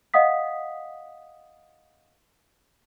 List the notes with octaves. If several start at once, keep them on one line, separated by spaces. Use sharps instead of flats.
D#5 F5 F#5 D#6 B6